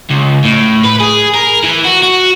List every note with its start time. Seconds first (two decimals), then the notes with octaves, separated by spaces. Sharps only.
0.10 C#2
0.44 A2
0.84 B4
1.00 G#4
1.34 A#4
1.64 E3
1.85 F#4
2.03 F#4